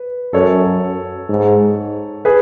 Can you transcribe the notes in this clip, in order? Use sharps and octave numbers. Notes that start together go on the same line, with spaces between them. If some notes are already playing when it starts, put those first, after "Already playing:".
Already playing: B4
F#2 A4 C#5
G#2
G#4 B4